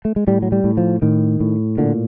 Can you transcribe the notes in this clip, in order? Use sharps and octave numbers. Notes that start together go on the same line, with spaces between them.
A3
G#3
A2 G3
F#3
G3
A2
F3
A2 D#3
A2
A#2 D3